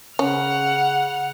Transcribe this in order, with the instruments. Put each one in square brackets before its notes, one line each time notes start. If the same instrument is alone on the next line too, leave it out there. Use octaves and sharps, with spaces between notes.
[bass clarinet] C#3 [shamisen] C#4 [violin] F#5 F6